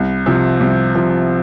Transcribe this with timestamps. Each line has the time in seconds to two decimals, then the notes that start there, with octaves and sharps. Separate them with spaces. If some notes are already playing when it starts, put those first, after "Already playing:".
Already playing: C2
0.26 C3 F3
0.61 C2
0.95 C3 F3